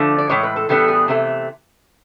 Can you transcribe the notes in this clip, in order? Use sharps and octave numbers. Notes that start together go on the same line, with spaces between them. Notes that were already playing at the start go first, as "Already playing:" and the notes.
Already playing: D3 F3 A3 D4
D5
A2 E3 G#3 C#5
B4
A4
A2 E3 G3 B3 D4 A4
G#4
C3 E3 A3